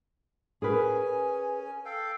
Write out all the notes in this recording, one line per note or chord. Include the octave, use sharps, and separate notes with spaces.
C#4 G#4 A#4 B4 G#5
A4 F5 G5